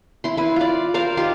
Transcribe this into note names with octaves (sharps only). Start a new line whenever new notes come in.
E4 C6
E4 B4
F4 D5
A#4 C5 D5 F5
D#4 F4 G4 C6